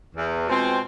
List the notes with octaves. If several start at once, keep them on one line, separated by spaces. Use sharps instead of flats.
E2
B2 G#3 C4 F4